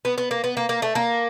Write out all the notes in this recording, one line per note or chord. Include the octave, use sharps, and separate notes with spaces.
B3
B3
A#3
B3
A#3
A#3
A3
A#3